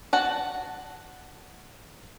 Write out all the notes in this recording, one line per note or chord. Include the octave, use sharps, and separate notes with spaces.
F#4 F#5 A5